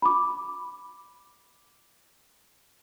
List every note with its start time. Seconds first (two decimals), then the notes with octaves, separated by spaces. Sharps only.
0.02 B5 D6